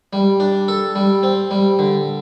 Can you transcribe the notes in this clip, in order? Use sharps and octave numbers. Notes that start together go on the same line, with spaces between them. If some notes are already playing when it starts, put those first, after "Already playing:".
G3
D4
A4
G3
C4
G3
D3